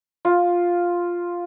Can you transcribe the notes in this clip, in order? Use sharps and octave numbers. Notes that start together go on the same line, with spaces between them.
F4